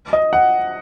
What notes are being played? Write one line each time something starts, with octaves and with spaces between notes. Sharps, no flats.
D#5
F#5